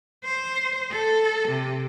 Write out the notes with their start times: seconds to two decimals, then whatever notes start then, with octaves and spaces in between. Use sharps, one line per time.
0.24 C5
0.92 A4
1.49 C3